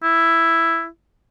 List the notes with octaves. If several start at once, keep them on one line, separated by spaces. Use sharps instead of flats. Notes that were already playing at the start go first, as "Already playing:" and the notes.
E4